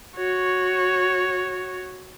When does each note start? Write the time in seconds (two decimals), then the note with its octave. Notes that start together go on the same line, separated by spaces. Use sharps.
0.16 F#4 C#5